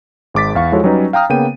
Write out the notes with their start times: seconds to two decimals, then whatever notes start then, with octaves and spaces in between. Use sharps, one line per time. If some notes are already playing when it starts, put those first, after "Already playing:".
0.34 G#1 G#3 D6 A6 B6
0.55 E2 F5 C#6
0.72 F3 G#3 E4 F#4 A4 C#5
0.84 F#3 G3 C#4 D#4 B4
1.13 F5 G5 A#5 D#6 F6
1.30 C#3 A#3 B3 G5 D#7